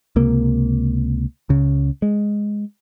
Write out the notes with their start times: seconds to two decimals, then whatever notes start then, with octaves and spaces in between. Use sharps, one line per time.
0.16 C#2 C3 A#3
1.49 C#2 C#3
2.02 G#3